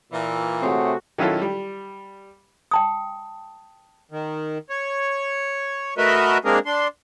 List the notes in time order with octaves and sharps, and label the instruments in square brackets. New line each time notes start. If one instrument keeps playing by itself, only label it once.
[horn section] A#2 E3
[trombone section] C3 A3 F#4 [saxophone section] C4 G#4 C#5
[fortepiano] D#3 F#3 C#4 E4 F4 A4
G3
[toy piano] G5 A5 D#6
[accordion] D#3
C#5
A3 F#4 A#4 B4 D#5 E5
G#3 A#3 C4 D4 G#4 A#4
D4 C6